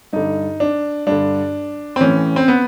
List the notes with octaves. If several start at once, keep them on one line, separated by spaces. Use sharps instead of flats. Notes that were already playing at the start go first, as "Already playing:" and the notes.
G2 D3 D#4
D4
G2 D3 D4
C4
A2 E3 C#4
C4
B3